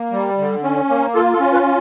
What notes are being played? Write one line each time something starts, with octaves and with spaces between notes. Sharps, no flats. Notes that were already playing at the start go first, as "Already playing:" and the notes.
Already playing: A#3
G3
D3
C#4
A#3
F4 A4
A4
C#4
B4